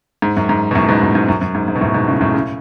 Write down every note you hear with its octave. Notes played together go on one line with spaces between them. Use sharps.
G#2
F#2
G#2
B2
F#2 A2
G#2 B2
F#2 A2
G#2
F#2
F#2
G#2
G#2
B2
F#2 A2
G#2 B2
A2 C#3
F#2 A2
A2 C#3